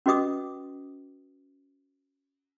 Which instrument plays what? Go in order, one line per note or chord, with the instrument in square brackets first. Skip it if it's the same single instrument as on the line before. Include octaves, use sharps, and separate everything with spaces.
[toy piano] C#4 F#4 B4 D#5 D6 D#6